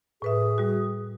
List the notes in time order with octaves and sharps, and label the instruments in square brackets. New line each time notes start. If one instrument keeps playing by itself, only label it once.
[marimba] A2 B4 E5 [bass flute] G#4
[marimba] G3 F#4